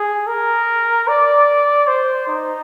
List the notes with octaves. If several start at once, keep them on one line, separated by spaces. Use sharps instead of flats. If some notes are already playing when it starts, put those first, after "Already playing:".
Already playing: G#4
A#4
D5
C5
D#4